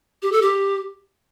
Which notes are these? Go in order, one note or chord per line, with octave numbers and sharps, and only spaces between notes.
G4
A4
G4